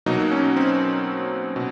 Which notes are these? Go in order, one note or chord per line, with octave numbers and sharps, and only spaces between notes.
B2 F#3 A#3 D#4
C#4
C4
B2